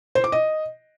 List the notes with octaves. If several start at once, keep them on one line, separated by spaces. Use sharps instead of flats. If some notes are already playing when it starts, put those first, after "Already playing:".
C5
D6
D#5